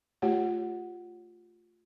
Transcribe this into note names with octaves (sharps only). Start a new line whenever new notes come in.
A3 F4 G4 C#5 F#5